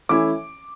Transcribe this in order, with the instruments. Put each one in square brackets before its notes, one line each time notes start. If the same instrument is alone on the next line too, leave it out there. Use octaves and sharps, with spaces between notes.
[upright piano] E3 A3 C#4 E4 D6